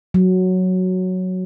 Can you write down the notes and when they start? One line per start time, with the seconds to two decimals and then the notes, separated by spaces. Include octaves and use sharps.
0.14 F#3